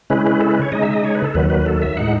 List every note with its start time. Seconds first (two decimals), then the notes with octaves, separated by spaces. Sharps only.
0.10 C#3 G#3 C#4 E4 B4
0.26 B4
0.41 A4
0.51 B4
0.62 C#5
0.72 C#3 G#3 D#4 D#5
0.83 E5
0.93 D#5
1.04 C#5
1.15 B4
1.24 A4
1.35 D#2 D#3 F#3 B4
1.50 B4
1.66 A4
1.82 E5
1.97 A2 G#3 D#4 F#5